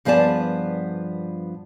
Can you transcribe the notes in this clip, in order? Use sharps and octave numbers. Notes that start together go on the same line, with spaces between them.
G2 F3 B3 G#4 D5 A5